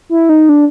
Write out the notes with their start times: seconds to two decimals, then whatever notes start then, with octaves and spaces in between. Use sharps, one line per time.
0.09 E4
0.29 D#4
0.49 D4